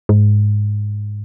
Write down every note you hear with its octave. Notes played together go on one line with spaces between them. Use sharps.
G#2